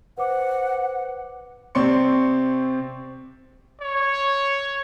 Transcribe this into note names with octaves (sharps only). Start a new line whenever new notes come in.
B4 C5 F#5 D6
C3 C4 D5 C6 C#6 C#7
C#5